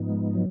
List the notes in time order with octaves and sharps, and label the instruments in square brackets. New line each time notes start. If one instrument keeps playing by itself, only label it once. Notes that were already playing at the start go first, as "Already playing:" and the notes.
Already playing: [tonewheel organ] G#2 F3 B3 D#4
[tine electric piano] G#3
F#3